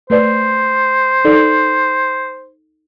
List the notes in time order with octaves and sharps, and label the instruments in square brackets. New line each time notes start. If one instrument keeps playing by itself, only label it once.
[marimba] A3 B4 D5 [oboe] C5
[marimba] D#4 A4 D5